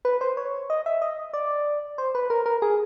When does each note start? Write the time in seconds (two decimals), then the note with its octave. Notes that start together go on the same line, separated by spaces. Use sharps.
0.05 B4
0.21 C5
0.37 C#5
0.70 D#5
0.86 E5
1.02 D#5
1.34 D5
1.98 C5
2.15 B4
2.30 A#4
2.46 A#4
2.62 G#4